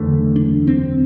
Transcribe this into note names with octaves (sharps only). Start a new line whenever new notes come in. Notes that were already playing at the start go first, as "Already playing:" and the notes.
Already playing: F#1 E2 D3 A3
D4
C4